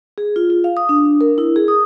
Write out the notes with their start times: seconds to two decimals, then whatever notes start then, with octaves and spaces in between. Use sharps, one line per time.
0.18 G#4
0.36 F4
0.50 F4
0.64 F5
0.77 D#6
0.89 D4
1.21 A#4
1.38 E4
1.56 G#4
1.68 D#6